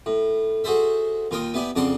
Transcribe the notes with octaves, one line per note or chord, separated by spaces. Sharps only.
A2
F#4 G#4 A4 C5 E5
D#2 F4 A#4 G5 D#6
B3 E4 G4 D5 G#5
F2 C#3 D4 F#5 A5 C6